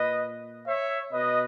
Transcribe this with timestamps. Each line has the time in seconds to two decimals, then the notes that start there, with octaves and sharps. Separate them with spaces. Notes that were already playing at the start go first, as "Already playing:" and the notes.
Already playing: A#2 B4 D#5
0.67 C#5 E5
1.12 B2 B4 D#5